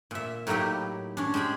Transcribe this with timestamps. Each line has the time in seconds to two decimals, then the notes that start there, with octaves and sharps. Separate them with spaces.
0.11 A#2 E5
0.47 A2 F#3 A#3 D#4 E4 G4
1.17 C#4 D4
1.34 G#3 G4 G#4 B5